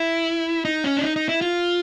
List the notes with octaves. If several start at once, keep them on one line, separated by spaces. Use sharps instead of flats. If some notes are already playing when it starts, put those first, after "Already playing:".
Already playing: E4
D#4
C#4
D4
D#4
D#4
E4
F4